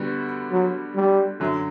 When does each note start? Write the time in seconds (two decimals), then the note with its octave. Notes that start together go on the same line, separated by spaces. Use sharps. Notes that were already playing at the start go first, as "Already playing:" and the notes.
Already playing: D3 G3 B3 D4 F#4
0.51 F#3
0.95 G3
1.40 F#2 D3 F#3